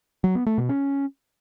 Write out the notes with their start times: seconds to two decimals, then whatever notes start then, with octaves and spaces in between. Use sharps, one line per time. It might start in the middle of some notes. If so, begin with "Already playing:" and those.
0.24 F#3
0.35 B3
0.46 A3
0.58 B2
0.69 C#4